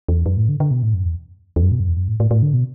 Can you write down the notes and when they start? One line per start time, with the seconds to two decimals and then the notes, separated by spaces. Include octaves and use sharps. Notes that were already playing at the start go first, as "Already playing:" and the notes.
0.09 E2
0.26 F#2
0.37 A2
0.49 D3
0.60 D3
0.71 B2
0.83 A2
0.94 F#2
1.05 E2
1.56 E2
1.63 F#2
1.72 B2
1.80 F#2
1.88 E2
1.97 F#2
2.08 A2
2.20 A2
2.31 A2
2.42 D3
2.54 B2